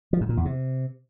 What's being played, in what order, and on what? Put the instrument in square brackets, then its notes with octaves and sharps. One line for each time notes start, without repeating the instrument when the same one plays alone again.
[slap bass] F3
G#2
A#2
E2
C3